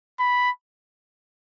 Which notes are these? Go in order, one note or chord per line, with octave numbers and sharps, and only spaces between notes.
B5